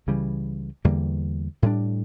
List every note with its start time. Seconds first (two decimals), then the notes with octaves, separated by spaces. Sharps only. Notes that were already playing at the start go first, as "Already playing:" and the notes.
0.07 C#2 C#3 E3 G3
0.84 E2 D3 G3 A#3
1.62 A2 G3 D4